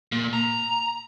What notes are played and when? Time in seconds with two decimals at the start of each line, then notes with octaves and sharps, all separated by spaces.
0.12 A#2
0.33 A#5